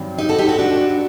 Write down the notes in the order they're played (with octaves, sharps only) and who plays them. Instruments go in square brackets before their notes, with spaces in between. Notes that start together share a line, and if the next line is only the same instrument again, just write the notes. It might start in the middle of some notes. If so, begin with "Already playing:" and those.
Already playing: [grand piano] G2 D#3 F#3 C4
[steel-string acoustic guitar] D#4 G4
F#4 A4
D#4 G4
F#4 A4
D4 F#4